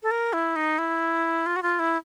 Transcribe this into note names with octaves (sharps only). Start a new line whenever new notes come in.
A4
A#4
E4
D#4
E4
F4
F#4
F4
E4